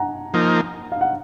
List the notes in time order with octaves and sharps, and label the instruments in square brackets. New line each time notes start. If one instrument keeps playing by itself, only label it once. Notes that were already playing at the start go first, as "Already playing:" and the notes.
Already playing: [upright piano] F#5 G#5 A#5
[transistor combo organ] F3 A#3 D#4
[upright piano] F5
F#5